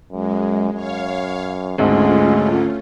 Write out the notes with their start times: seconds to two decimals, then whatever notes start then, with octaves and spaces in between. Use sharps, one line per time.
0.12 F#2 G#3
0.73 F#2 C#5 F5
1.78 G#1 D2 D3 G#3 A3 C#4 F4